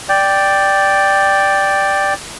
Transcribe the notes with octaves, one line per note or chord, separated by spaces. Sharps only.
D5 G5